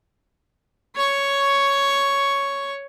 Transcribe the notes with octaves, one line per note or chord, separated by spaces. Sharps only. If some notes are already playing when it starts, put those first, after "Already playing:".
C#5 C#6